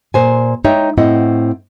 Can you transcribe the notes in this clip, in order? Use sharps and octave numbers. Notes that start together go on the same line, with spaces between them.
A#2 C5 G#5
G#3 D#4 C#5 E5 G5
A2 C4 E4 D#5 F#5